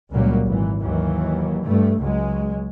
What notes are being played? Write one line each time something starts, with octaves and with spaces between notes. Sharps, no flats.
C#2 A#2 F#3 G3 A#3
G#1 E3
D#2 E3 F#3
G2 A3
C#2 F#3 G#3